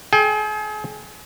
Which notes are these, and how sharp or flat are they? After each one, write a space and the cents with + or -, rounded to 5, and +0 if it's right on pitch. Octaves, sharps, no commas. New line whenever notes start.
G#4 +40 G5 +40